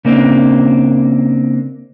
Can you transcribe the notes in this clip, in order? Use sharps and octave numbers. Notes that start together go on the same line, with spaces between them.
C#3 A#3 C4 D4